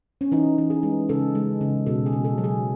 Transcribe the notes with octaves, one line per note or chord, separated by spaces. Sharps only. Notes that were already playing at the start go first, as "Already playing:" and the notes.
C#4
E3 D#4
E3
G#4
G#3
C#3 A4
G#3
C#3
B2 A4
G#4
B2
A4
F#3
G#4